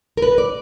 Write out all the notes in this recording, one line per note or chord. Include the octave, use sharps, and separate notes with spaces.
A#4
B4
D5